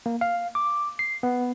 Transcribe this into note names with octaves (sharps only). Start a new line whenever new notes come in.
A#3
F5
D6
C7
B3